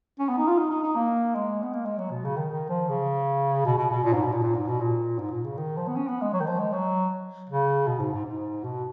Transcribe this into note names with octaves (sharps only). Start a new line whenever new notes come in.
C#4
B3
D#4
F4
D#4
D#4
D#4
A#3
G#3
B3
A#3
G#3
F#3
B2
C#3
D#3
D#3
F3
C#3
B2
B2
B2
A#2
G#2
B2
A#2
A#2
G#2
B2
A#2
G#2
A#2
C#3
D#3
F3
B3
C#4
B3
G#3
F#3
D#3
F3
G#3
F#3
C#3
B2
G#2
G#2
G#2
B2